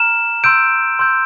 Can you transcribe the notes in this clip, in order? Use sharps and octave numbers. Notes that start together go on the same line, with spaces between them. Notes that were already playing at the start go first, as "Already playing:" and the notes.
Already playing: A#5 F6 E7
C6 E6 G6 D7
C6 E6 G6